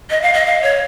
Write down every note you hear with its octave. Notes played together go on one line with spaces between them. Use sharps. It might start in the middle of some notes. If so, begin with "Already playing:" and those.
D#5
F5
D#5
F5
C#5